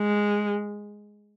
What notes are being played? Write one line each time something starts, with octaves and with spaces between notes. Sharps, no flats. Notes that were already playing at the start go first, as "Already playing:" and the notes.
Already playing: G#3